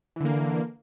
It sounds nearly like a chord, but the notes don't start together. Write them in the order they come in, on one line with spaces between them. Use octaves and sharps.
E3 D3 A#3